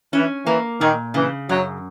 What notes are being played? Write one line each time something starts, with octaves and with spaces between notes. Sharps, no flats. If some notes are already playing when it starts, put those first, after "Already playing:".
E3 C#4
E3 A#3
A#2 D#3
C#3 E3
F#2 F#3